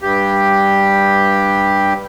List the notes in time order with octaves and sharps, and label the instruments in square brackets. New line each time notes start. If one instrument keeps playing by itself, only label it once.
[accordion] G2 G4